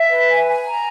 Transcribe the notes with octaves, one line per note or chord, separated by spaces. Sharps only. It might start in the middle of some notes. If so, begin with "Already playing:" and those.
Already playing: E5
B4
G#5
G#5
A#5